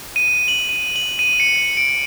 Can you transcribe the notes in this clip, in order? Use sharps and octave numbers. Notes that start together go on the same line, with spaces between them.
D#7
F#7
D#7
F#7
D#7
C#7
D7